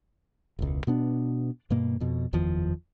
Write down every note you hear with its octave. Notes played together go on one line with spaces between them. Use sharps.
E1 C#2
B2 B3 D4
G2 B2 A#3
F2 B2
F#1 E2 D#3 F3